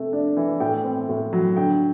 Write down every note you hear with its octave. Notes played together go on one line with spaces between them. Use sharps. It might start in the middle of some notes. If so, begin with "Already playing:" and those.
Already playing: C3 A3
D4
E3
A2 G5
C4
A2
F#3
D3 G5